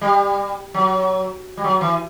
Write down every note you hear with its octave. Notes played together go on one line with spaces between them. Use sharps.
G3
F#3
G3
F#3
E3